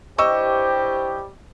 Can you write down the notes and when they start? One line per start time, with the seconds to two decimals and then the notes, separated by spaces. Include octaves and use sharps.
0.18 G2 G3 E4 G4 C5 D#5 C#6 E6